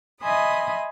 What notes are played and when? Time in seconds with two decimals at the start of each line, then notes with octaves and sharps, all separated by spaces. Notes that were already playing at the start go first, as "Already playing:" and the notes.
0.21 D#5 E5 G#5 B5 C6 D#6